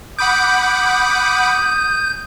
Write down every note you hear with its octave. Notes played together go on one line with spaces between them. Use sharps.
F#5 B5 D6 D#6 G6